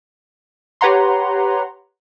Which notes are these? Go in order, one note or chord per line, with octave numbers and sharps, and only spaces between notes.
G4 B4 C#5 F#5 A#5 C6